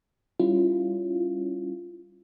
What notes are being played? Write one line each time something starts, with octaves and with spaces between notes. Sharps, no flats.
G3 C#4 E4 F4